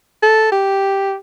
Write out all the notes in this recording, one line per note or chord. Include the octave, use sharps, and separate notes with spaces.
A4
G4